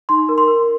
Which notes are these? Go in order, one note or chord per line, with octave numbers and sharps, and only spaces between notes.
D#4 C6
A#4
C6
A#4